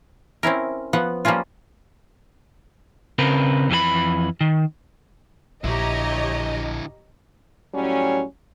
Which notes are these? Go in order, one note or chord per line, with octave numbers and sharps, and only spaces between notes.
C4 C#4 E4 A#4
F3 B3 F#5
F3 G3 A#3 C#4 F4
C#3 C4 A#4 B4
F2 E3 A4 B5
D#3
A#1 D3 E4 G4 C#5 D#5 A#5
A2 F#3 G3 C#4